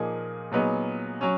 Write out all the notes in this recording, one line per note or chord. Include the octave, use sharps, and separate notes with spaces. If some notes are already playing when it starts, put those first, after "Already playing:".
Already playing: A#2 F3 A#3 D#4 G#4
A#2 F#3 B3 D#4 G#4
F#3 C#4